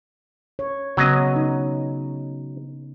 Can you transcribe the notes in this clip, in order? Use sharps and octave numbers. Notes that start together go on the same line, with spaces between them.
C#5
C#3 F#3 B3 C#4 D#5
D#4